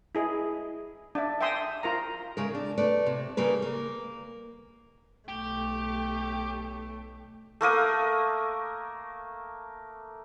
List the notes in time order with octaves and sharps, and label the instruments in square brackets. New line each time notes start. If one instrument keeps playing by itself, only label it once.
[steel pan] E4 G#4 D#5
D4 E5
E5 G5 G#5 C6 D#6 E6
F4 A#4 A#5
[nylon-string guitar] C#3 G#3 A#4
D4
A3 B4 D5
C3
C#3 G3 A#3 B4
A#3
[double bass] B1 A3 [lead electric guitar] G4
[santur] A3 A#3 A#4 D#6